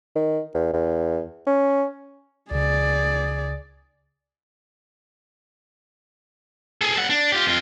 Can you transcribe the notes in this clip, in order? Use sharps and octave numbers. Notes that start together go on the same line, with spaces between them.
D#3
E2
E2
C#4
C#2 C#3 G#4 D5
G#4 A4
G3 F#5
D4
F4 G4
F2 F4